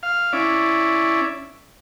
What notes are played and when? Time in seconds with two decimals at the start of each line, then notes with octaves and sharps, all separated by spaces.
0.03 F5
0.33 C#4 E4 D5